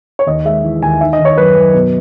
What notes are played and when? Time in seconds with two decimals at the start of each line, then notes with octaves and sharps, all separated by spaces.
0.19 C#5
0.26 D#2 D#5
0.45 G#3 E5
0.64 E3
0.82 D#2 G#5
1.01 D#3 E5
1.13 D#5
1.19 D#3
1.25 C#5
1.38 F#2 B4
1.56 F#2
1.74 B2